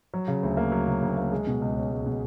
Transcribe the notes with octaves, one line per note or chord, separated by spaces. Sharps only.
F#3
C#3
D2
A#3
F#3
C#3
D2
A#3
G#3
B2
C#2
C#4
G#3
B2